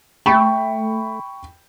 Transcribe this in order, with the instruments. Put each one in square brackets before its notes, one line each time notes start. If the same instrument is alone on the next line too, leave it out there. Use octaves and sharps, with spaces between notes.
[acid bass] A3 [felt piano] G5 B5 C#6